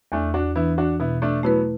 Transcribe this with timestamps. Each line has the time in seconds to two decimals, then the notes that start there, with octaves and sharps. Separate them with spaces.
0.12 E2 A3 D4
0.34 D4 F#4
0.55 E3 B3 D4 E4
0.78 D4 F#4
1.00 B2 B3 E4
1.22 A3 D4
1.43 F#3 A3 B3 E4 B4